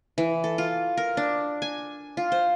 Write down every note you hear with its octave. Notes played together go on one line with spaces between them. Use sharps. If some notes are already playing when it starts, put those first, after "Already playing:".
E3
A4
F4
A#4
D4
G#5
F4
C5